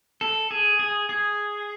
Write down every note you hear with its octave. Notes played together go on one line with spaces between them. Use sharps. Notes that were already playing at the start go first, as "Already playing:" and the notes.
A4
G#4
G#4
G#4